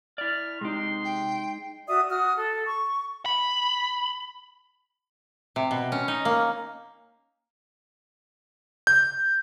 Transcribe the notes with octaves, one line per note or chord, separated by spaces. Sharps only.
E4 D5 F6
C3 G#3 D#4 G4 C6
G5
F#4 D5 E5 D#6
F#4 D#6 F6
A4
C#6
B5
C3
B2
C#4
D#4
A#3
G6